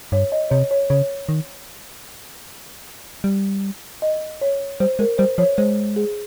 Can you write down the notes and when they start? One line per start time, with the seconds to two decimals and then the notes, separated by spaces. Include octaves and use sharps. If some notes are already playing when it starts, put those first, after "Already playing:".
0.12 G2 C#5
0.32 D#5
0.51 C3 C#5
0.71 C#5
0.90 C#3 C#5
1.29 D#3
3.24 G3
4.02 D#5
4.41 C#5
4.80 G3 C5
4.99 G#3 A#4
5.18 G3 C5
5.38 F3 C#5
5.58 G#3 C5
5.96 G#4